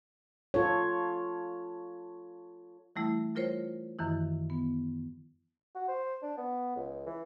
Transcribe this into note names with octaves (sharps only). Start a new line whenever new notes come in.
F4 A4 C#5
E3 G3 A3 E4
G3 F4 A#4 C5 C#5
F#2 D#3 E3 E4
B3
F#4
C5
D4
B3
C#2
E3